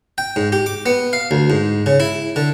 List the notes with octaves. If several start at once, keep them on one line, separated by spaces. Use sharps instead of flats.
G5
G#2
G4
D6
B3
F5
D2
G#2
C#3
E4
D3